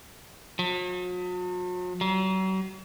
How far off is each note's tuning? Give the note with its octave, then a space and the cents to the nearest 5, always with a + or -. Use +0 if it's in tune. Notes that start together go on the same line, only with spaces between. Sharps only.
F#3 -45
F#3 +40